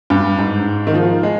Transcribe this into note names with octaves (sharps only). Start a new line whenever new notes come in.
G2
G#2
D#3
F3
G#3